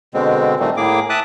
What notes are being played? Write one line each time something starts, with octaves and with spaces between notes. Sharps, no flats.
B2 D3 G#3 C4
A#2 D#3 G3 A3 C4
A2 A#3 G#4 D6
E5 A5 D6 D#6 F#6